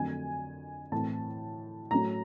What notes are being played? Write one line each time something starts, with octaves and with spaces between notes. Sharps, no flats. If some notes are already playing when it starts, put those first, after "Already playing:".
Already playing: F2 D3 F#3 A3 G#5
A2 E3 A3 C4 A5
A2 F#3 A3 C#4 A#5